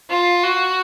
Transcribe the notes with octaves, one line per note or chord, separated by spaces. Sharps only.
F4
F#4